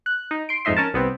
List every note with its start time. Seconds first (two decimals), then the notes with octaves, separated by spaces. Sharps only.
0.06 F#6
0.31 D#4
0.49 C6 D7
0.65 F2 G#2 D#4 E5 C6
0.77 C#4 A#4 A5
0.94 C2 B3 C4